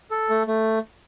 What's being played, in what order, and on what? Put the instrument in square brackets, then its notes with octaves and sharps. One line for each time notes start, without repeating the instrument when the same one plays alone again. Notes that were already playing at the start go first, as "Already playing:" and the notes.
[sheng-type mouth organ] A4
A3
A3